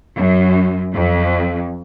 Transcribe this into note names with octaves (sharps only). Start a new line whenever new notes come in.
F#2
F2